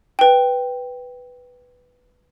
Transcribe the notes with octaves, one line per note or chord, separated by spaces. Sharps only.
B4 G5